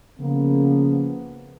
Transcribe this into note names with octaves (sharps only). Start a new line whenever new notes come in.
C#3 F3 A#3 B3